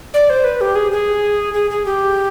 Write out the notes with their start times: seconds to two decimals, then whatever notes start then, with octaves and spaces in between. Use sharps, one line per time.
0.14 D5
0.30 C5
0.44 B4
0.61 G4
0.76 G#4
0.92 G#4
1.54 G#4
1.70 G#4
1.86 G4